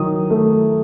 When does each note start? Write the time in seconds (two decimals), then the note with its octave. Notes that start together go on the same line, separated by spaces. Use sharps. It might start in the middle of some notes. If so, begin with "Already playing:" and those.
Already playing: D#3 F#3 D#6
0.30 A3